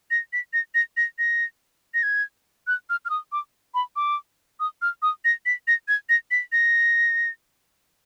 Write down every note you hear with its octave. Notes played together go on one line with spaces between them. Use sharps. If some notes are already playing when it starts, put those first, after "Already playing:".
A#6
B6
A#6
A#6
A#6
A#6
A#6
G#6
F#6
F6
F6
D#6
D6
B5
D6
D#6
F6
D#6
A#6
B6
A#6
G#6
A#6
B6
A#6